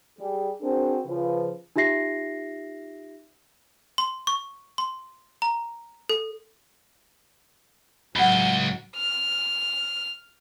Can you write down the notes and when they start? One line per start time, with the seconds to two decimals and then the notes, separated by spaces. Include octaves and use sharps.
0.18 G3 G#4
0.61 C4 D4 F#4 G#4 A#4 C5
1.06 C#3 F3 B4
1.76 D#4 F4 G4 E5 A#6 C7
3.98 C6
4.27 C#6
4.78 C6
5.42 A#5
6.09 A4
8.16 C#2 A2 F#3 F#5 B5 G7
8.96 F6